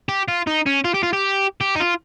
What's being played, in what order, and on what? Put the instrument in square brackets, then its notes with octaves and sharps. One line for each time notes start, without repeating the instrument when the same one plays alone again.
[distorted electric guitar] G4
F4
D#4
C#4
F4
G4
F4
G4
G4
D#4
F4